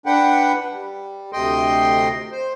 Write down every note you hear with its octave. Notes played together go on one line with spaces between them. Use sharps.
D4 B4 F#5 G5
G3
D2 C3 D#5 G5 C6
C5